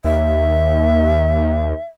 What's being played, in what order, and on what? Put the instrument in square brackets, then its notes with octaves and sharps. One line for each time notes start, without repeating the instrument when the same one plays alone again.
[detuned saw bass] D#2 [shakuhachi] E5